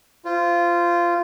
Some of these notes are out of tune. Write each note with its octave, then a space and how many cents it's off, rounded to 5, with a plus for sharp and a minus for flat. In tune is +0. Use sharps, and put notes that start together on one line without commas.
F4 -15 C5 -15